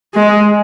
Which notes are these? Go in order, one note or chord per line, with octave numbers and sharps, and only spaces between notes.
G#3